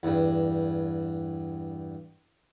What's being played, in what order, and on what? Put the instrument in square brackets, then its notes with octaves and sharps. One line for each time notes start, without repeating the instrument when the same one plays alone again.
[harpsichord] E2 G2